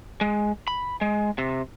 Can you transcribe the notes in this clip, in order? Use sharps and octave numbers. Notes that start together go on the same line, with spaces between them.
G#3
B5
G#3
C3